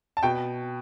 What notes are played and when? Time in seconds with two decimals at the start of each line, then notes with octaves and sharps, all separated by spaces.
0.17 A5
0.23 B2 G5